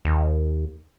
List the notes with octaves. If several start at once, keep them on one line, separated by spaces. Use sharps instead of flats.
D#2